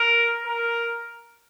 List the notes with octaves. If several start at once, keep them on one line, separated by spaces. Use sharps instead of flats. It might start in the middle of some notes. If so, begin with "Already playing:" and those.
Already playing: A#4
A#4